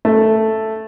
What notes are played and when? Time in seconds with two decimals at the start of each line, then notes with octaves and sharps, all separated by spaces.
0.05 A3